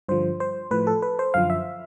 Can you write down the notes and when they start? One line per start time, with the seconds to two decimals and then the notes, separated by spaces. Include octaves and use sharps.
0.08 G2 D3 F3 C5
0.40 C5
0.71 A2 F3 B4
0.87 A4
1.02 B4
1.19 C5
1.34 F#2 D3 F3 F5
1.50 E5